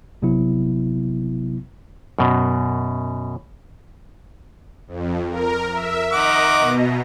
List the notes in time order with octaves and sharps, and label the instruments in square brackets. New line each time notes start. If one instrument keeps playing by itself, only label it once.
[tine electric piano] A1 C3 F#3 B3 E4
[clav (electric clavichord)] F#2 B2
[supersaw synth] F2
A#4
E5
[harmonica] D#3 F#5 D6 [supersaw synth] D#5 A#5
[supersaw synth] B2